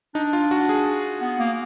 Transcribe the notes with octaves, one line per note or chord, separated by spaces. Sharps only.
D4 D#4
F4
F#4
G#4
B3
A#3